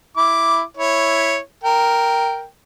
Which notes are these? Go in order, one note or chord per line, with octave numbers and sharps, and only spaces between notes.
E4 D6
E4 C#5
A#4 G5